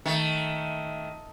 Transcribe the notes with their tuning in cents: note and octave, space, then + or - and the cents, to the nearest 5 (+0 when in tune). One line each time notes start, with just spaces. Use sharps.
D#3 +15 A3 +10